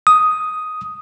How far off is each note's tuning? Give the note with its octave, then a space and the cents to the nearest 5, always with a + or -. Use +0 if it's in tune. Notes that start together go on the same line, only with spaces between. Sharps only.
D#6 +5